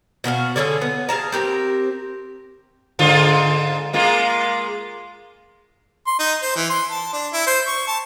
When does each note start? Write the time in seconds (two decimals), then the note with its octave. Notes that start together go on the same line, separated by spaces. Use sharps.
0.24 B2 F#4 A#4 F5
0.56 D3 C#4 G#4 A4
0.82 B3
1.09 G#4 F5 A5 A#5
1.32 C4 G4 A#4
2.99 G#2 D3 F4
3.93 G#3 A#3 F4
6.07 C6
6.19 D#4
6.42 C5
6.56 E3
6.70 C6
6.91 A5
7.13 D4
7.33 E4
7.47 C5
7.67 C#6
7.87 A5